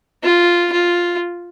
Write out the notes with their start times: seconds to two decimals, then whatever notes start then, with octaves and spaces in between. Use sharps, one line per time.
0.23 F4
0.72 F4